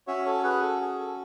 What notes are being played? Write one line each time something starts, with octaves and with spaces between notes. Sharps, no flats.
C#4 F#4 C#5 E5
A4 C#5
G#4 B4
A4
G#4
A4